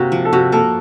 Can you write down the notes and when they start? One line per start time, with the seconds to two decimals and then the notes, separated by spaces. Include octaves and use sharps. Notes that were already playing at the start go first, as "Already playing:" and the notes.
Already playing: C3 A#3 F#4
0.12 F3
0.25 A4
0.33 C3 F#4
0.52 A#3 A4